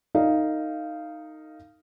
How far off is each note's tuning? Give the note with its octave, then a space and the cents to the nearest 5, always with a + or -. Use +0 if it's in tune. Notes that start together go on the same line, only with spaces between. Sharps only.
D#4 +0 A4 +45 F5 -10